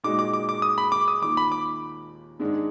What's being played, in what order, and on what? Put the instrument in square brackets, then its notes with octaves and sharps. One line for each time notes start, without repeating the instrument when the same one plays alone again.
[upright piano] A#2 G#3 D#4 F#4 [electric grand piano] D6
[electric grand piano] D6
D6
D6
D#6
B5
D6
D#6
[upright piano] D#2 D#3 A#3 F4 [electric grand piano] D6
[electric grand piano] B5
D6
[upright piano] G#2 D#3 G#3 D4